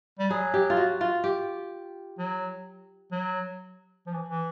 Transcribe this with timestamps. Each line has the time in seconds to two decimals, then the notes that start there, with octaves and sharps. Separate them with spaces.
0.19 G3
0.30 F#3 G#4
0.54 G4
0.70 F4
0.77 F#4
1.01 F4
1.24 G4
2.19 F#3
3.12 F#3
4.07 F3
4.13 E3
4.28 E3